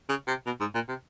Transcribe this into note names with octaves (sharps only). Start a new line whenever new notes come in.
C#3
C3
B2
G#2
A#2
C3